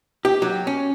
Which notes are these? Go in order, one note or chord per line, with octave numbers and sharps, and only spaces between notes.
G4
F#3
C#4